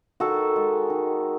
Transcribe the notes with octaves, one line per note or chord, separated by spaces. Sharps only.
D#3 F#4 A4
G#3
D#3